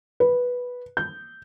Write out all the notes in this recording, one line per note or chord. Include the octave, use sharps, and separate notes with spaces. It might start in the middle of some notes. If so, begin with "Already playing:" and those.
B4
G6